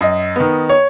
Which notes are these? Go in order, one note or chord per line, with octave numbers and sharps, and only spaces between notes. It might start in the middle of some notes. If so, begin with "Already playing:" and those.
F#2 D#5
D#3 B3
C#5